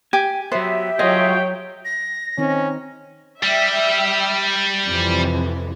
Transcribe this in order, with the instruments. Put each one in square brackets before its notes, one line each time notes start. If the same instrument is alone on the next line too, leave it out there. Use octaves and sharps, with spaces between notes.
[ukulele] G4 [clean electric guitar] G#5
[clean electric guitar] F#3 B3 [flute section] G4 E5 [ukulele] C5
[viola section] F#3 C#5 G5 [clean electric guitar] F4 G#4 [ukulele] D#5
[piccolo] A#6
[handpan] D#3 C4 D#4 [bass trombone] C#4
[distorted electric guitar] G3 [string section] E5 G5
[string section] F2 C3 E3